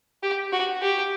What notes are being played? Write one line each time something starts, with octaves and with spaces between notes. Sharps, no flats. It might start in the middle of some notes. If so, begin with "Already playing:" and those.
G4
F#4
G4